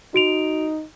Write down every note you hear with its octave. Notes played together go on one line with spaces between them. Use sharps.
D#4 F#4 D7 F7